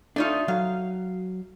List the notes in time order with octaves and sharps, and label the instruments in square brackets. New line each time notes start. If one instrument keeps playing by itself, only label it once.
[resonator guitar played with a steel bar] A3 D#4 F4 [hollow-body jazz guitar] D4 C#5
[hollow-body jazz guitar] F#3 [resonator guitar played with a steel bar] F5